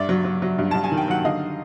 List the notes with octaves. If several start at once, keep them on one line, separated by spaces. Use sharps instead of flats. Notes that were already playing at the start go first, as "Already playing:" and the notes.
Already playing: G2 D5 E5
F#3
F#3
F#3
G2
G2 A5
G#5
D#3
G5
F#3 F#5
D3 D#5 F5